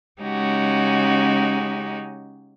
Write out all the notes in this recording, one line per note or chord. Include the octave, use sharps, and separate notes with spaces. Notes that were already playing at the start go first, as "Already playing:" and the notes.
C#3 G#3 C#4 D#4 F#4 G4